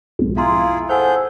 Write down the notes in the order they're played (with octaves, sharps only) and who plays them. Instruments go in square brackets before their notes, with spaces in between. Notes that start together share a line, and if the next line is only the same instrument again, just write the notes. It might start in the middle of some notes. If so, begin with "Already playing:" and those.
[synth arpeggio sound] B1 F2 G#2
[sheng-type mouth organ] E4 F4 G#4 [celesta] F5 A#5 C6
[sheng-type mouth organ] G#4 A4 G6 [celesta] C5 F#5 G#5